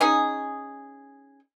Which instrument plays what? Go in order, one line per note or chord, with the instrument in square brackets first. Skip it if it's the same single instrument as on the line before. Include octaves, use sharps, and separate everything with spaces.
[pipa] C#4 D#4 G#4